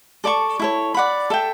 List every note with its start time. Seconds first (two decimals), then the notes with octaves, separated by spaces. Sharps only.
0.24 A4 D5 A5 C#6
0.59 E4 A4 C#5
0.94 D5 F#5 B5
1.30 A4 E5 G5